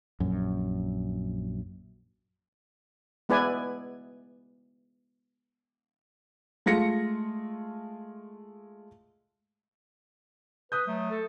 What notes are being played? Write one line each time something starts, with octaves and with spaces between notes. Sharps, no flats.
A#1 F#2
G#3 B3 E4 B4 D5 G#5
G#3 A3 F4 A#6 C#7
B4 D#6 G6
F#3 A3
A4